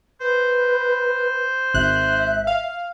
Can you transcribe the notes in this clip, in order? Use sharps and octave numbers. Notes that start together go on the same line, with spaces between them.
B4 C5
G#1 E5 F#6
F5